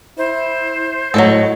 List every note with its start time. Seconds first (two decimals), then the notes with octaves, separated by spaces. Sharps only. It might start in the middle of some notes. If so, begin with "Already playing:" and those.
0.18 E4 C5
1.14 A2 F#3 G#3 A4 D#5